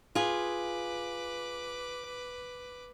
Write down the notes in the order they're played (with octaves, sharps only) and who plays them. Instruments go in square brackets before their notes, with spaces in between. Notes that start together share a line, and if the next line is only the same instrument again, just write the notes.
[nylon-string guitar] F4 G#4 [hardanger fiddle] B4 D6